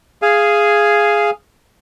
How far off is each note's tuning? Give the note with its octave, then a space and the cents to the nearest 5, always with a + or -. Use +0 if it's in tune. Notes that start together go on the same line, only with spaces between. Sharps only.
G#4 +0 F5 -10 G#5 +0